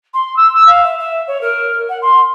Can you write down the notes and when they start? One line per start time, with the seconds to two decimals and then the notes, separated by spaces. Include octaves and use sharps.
0.14 C6
0.36 E6
0.66 F5
0.84 E5
0.98 E5
1.27 C#5
1.41 A#4
1.89 F#5
2.02 C6